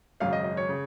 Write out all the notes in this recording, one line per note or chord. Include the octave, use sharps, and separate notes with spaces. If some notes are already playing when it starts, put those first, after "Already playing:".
G#1 F#2 C#3 F5
D#5
D#5
C#5
C#3